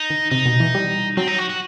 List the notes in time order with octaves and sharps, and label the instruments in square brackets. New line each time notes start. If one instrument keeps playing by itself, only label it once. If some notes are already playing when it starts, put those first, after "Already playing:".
Already playing: [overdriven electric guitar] D#4
[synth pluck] D#3
[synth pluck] C3 [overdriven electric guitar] D#4
[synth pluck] B2
E3
G3
[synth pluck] F#3 [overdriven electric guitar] C4
[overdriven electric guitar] D#4
F#4
F#4